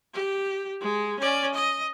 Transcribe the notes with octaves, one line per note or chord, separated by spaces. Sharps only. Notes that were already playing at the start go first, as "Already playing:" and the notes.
G4
G#3
C#4 D5
D#5